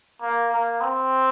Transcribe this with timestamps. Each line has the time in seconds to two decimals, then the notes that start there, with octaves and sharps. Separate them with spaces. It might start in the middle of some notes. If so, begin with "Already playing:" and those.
0.21 A#3
0.52 A#3
0.81 C4